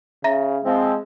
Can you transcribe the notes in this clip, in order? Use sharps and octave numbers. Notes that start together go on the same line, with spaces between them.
C#3 E5 A#5 A#6
F3 G#3 C4